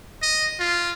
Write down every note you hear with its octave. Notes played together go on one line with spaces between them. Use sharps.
D#5
F4